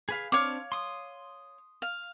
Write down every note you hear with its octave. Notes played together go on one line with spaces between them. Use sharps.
G#4 B4 F5
C4 D4 C#5 F5 D6 F6
C6 D#6
F5